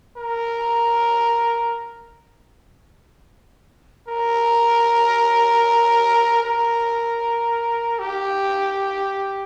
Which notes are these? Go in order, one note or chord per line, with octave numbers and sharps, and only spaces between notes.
A#4
A#4
A#4
G4